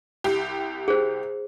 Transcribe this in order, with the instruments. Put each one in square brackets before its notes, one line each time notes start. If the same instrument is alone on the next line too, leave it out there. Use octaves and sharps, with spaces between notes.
[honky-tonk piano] C2 G4
[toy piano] G#4 C5